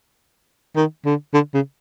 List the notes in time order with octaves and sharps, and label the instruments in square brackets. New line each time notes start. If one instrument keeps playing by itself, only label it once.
[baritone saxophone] D#3
D3
D3
C#3